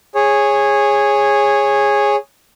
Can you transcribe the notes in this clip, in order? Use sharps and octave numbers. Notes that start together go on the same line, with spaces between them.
G#4 C#5